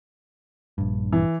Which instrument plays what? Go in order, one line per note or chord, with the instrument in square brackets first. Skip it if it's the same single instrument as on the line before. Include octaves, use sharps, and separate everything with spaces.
[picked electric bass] A#1 G2
[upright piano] E3